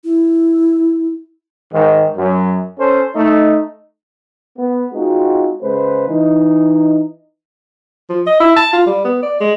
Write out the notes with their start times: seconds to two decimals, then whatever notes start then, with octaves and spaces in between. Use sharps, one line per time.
0.04 E4
1.72 G#2 D#3
2.16 F#2
2.78 C#4 A4 C5
3.14 A3 D#4
4.58 B3
4.93 G#3 C4 D#4 F4 F#4
5.62 C#3 G#3 B4 C5
6.08 E3 D#4
8.09 F3
8.27 D#5
8.40 E4
8.56 A5
8.73 F4
8.87 G3
9.05 B3
9.23 D5
9.41 G#3